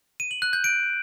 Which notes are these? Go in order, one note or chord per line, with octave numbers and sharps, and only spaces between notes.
D#7
F#7
F#6
G6
D7